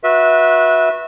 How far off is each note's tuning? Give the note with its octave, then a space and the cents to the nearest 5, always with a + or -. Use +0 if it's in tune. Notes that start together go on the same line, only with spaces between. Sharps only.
F#4 -25 B4 -15 E5 -20